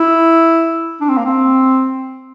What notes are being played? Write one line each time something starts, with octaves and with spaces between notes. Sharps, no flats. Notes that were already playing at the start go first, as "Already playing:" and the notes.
Already playing: E4
D4
C4
A#3
C4